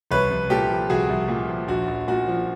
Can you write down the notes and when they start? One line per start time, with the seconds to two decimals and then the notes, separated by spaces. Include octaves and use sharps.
0.11 C2 B4 C#5
0.31 C2
0.50 A#2 G4 A4
0.69 F3
0.90 C2 F#4 G#4
1.09 C2
1.28 A#2
1.49 F3
1.68 A#1 F#4
1.88 A#1
2.08 A#2 F#4
2.28 F3